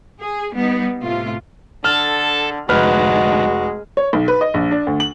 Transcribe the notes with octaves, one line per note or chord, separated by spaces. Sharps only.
G#4
G3 B3 D#4
A2 C3 A3 F4
D3 A4 F6
F1 D2 G#2 G#3 F#4 B4 F6
C#5
B1
B4
D#5
A#1
D4
D2
F#7